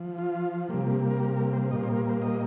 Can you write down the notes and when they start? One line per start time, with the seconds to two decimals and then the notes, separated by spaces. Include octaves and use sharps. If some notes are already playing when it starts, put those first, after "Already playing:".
Already playing: F3
0.18 F4
0.69 C3 G3 A#3
1.11 A#4
1.20 G4
1.36 A#4
1.53 C5
1.71 A#2 G3 A#3 D#5
1.83 C5
1.96 A#4
2.09 C5
2.22 D#5